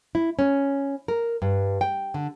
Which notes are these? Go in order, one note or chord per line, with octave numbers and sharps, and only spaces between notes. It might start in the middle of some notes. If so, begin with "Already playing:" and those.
E4
C#4
A#4
G2
G5
D3